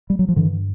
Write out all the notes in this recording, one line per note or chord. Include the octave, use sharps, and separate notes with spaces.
G3
F#3
F3
G2 D3 E3